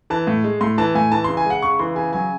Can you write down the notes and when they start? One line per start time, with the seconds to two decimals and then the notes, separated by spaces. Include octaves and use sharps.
0.10 E3 A5
0.27 A2
0.44 G#3
0.61 A2 C6
0.78 E3 A5
0.95 A2 G#5
1.12 E3 A5
1.24 C#3 C6
1.37 G#5
1.45 G#3
1.50 F#5
1.62 C#3 C#6
1.79 E3 C6
1.96 C#3 G#5
2.13 F#3 G#5